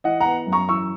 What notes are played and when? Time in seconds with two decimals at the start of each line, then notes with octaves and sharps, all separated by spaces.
0.04 E3 D#5 F#5
0.20 B3 F#5 A#5
0.47 F#2
0.52 A#5 C#6
0.69 E3 C#6 E6